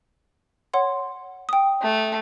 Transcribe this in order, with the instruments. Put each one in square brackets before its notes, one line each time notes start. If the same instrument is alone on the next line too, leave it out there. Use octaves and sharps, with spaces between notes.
[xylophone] C#5 F#5 C6
G5 D#6
[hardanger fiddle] A3